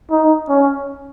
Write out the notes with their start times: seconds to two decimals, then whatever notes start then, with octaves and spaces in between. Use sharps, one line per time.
0.11 D#4
0.49 C#4